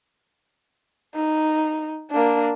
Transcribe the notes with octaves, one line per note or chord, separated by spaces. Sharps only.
D#4
A#3 D4